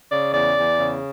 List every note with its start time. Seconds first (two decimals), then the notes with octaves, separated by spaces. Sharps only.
0.11 C#3 D5
0.34 E2 D5
0.57 E2
0.79 C#3